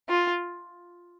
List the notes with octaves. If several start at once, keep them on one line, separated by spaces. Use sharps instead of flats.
F4